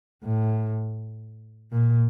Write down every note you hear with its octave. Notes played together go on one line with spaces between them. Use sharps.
A2
A#2